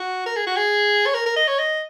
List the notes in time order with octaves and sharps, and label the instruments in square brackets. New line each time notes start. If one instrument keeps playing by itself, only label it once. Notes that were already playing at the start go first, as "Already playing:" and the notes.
Already playing: [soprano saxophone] F#4
A#4
G#4
F#4
G#4
C#5
A#4
A#4
D#5
C#5
D#5